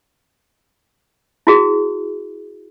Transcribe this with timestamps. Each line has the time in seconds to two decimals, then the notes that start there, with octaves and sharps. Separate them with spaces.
1.47 E4 F#4 G#4